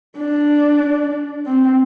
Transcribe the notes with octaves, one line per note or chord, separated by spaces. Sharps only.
D4
C4